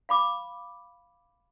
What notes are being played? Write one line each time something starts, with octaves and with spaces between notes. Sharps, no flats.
F5 B5 D6